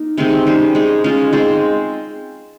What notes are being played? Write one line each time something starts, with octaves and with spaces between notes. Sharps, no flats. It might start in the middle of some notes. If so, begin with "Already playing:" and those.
Already playing: A#3 D#4
C3 D#3 G#3 C4
G3 C#4 G#4 C5
G#3 D#4 G#4
G#3 C#4 F4 C5
G#3 C4 F4 C5